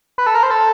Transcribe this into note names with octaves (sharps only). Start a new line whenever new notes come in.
B4
A4
A#4
C5
A4